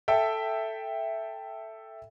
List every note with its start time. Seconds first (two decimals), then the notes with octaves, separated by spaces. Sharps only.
0.08 A4 E5 G5